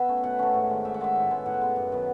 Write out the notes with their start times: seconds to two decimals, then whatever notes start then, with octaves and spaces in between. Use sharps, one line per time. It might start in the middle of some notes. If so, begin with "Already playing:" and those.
Already playing: B3 B4 E5
0.09 A3 C#4
0.24 B2 F#5
0.39 A3 C#4
0.54 G#2
0.70 D#3 G#3
0.85 G#2 E5
0.94 F#5
1.00 D#3 G#3 E5
1.16 A2
1.31 G#3 B3
1.46 A2 F#5
1.61 G#3 B3
1.76 F#2
1.92 D#3 F#3 B3